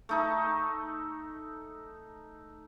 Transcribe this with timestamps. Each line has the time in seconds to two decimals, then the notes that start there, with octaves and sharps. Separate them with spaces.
0.09 A3 D#4 A4